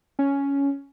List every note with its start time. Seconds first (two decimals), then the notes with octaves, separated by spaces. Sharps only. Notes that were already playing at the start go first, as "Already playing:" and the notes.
0.19 C#4